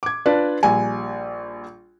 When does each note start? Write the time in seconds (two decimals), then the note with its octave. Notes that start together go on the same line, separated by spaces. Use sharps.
0.03 D6 G#6
0.26 D4 F4 B4 D5
0.63 A#1 G3 G#5